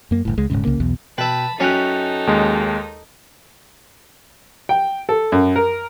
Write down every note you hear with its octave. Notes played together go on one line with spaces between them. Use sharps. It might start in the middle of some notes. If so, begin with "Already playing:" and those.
F#2 A#3
F#1 A2
C#2 G#3
D#1 A#1 G#2 C#3
C2 C#3 A#3
B1 E2 B2
B2 B4 E5 G5 A5 B5
F#2 C#4 D#4 A4 C#5 G5 F#6
D#2 G#3
G5
A4
F#2
A#4